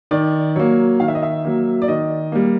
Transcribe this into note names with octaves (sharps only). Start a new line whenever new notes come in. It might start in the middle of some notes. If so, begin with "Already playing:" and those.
D#3 D5
F#3 A#3 C#5
D#3 F5
E5
D#5
E5
F#3 A#3
D5
D#3 D#5
G3 A#3